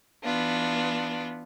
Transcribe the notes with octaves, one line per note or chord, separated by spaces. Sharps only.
E3 B3 D4 F4